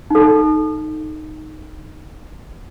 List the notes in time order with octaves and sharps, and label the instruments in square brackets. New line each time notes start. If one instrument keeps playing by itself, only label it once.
[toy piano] D#4 A4